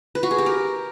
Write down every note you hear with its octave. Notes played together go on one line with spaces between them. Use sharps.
B4
F#4
G#4
G4
A#4